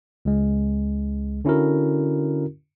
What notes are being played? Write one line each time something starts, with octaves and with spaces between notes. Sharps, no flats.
C#2 G#3
D3 C#4 E4 F#4 A#4